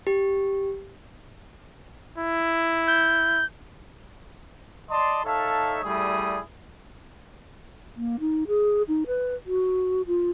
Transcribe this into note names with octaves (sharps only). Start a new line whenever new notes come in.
G4
E4
G6
D5 D#5 A5 C6
D#4 A4 C#5 E5 F5 A5
G3 A3 E4 G#4 D5 D#6
A#3
D#4
G#4
D#4
B4
F#4
F4